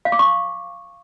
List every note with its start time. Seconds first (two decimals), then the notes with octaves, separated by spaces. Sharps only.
0.05 F5
0.12 D6
0.19 C#6